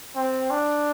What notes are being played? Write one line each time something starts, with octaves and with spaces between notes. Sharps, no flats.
C4
D4